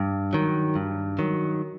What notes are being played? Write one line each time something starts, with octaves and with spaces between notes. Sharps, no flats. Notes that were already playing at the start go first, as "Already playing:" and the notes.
Already playing: G2
D#3 F#3
G2
D#3 F#3